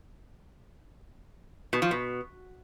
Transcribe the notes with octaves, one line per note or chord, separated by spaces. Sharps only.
B2
F3
B2